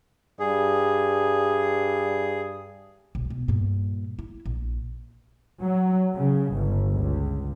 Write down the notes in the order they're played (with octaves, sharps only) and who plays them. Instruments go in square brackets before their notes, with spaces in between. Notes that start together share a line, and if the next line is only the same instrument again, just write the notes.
[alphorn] G2 [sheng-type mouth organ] G#4
[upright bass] D#1 B1
B2
G2 A#2
E4
A#1
[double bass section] F#3
C#3
G1
C#2